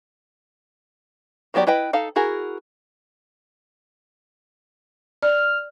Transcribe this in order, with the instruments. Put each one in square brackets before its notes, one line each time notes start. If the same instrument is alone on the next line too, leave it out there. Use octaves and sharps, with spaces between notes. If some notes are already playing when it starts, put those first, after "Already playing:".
[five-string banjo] D#3 F#3 B3 G4 D5
E4 B4 D#5 G5 B5
D#4 A4 F5
E4 F#4 G#4 A#4
[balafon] D5 [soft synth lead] F6